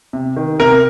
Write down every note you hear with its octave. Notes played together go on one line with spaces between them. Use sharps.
C3
D#3
C3 A#4